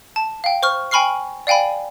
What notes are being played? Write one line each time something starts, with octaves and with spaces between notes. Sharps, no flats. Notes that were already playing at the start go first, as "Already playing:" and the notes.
A5
F5 G5
C5 C#6 F6
G5 G#5 B5 C#6 F6 C7
D5 F5 G5 G#5 B5